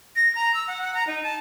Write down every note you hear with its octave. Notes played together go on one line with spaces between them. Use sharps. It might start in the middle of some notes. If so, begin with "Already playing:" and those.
A#6
A#5
E6
F#5
F#5
A#5
D#4
A5